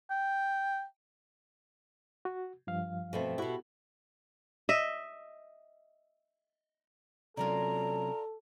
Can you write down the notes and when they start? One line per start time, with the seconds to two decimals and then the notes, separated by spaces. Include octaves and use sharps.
0.11 G5
2.25 F#4
2.67 G2 F3 F5
3.13 B2 A3 C4
3.38 B2 E4 F#4 G4
4.69 D#5 E5
7.37 C3 F#3 C#4 F4 A4 A#4 D5 A#5